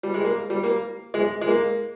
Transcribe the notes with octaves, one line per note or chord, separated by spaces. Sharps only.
G3
G#3
A#3
G3
A#3
G#3
G#3
A#3